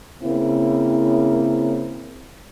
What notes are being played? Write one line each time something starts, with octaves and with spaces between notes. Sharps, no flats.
C#3 A#3 C4 E4